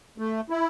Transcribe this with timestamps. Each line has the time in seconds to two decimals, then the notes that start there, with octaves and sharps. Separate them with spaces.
0.18 A3
0.50 E4